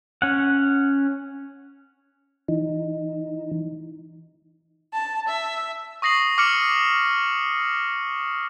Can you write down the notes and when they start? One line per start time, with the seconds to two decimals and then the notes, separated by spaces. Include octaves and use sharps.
0.22 C#4 F#5
2.48 E3 D#4
4.93 A5
5.28 E5
6.02 C#6 D#6 A#6 C7 F#7
6.38 D6 F6 C#7 F#7